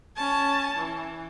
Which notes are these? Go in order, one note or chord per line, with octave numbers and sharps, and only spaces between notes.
C#4 A5
E3